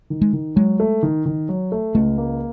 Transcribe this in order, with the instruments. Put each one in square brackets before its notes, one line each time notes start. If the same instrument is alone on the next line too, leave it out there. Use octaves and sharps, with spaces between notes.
[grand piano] D#3
[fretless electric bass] G#3
[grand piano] D#3
[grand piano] F#3 [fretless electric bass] G#3
[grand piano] A3
D#3
D#3
F#3
A3
[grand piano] C#2 [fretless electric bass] A3
[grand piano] A#3